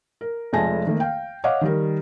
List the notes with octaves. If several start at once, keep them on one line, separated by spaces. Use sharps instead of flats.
A#4
F1 F2 G#3 G#5 A5 A#6
D#3 A3 A#3
F5 G5
C#5 D#5 F5 F#5 D6
D#3 G3 A#4